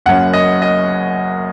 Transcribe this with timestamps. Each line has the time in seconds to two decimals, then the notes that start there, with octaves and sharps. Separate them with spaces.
0.06 F#1 F#2 F#3 C#4 F#5
0.33 D#5
0.62 D#5